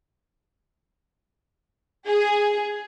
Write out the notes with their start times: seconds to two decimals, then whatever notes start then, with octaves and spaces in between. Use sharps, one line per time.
2.07 G#4